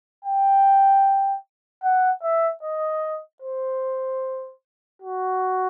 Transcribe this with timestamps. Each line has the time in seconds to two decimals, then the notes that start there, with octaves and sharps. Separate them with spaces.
0.25 G5
1.84 F#5
2.23 E5
2.63 D#5
3.42 C5
5.02 F#4